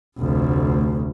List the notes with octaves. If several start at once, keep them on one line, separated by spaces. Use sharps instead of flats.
F1 D2